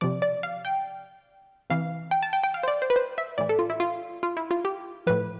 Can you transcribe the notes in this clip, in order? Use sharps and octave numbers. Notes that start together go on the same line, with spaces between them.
C3 F3 D5
D5
F5
G5
C3 E3 F5
G5
A5
G5
G5
F5
C5
D5
C5
B4
C5
E5
A2 E3 D5
A4
F4
E4
F4
F4
E4
F4
G4
A2 F3 B4